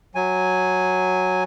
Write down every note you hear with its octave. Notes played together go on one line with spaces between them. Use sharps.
F#3 G#5